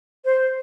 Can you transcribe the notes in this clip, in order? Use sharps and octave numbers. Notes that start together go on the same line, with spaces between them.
C5